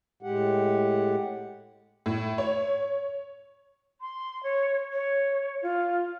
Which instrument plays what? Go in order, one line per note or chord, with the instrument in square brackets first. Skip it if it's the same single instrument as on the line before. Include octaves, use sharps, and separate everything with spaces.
[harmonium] A2 G#3 G4 F#5
[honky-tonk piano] A2
C#5
[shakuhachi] C6
C#5
C#5
F4